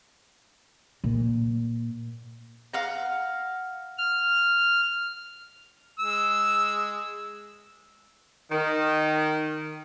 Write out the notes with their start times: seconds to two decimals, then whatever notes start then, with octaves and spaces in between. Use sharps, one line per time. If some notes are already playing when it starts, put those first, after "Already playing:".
1.04 A#2
2.74 F5 F#5 A#5
3.98 F6
5.99 G#3 E6
8.51 D#3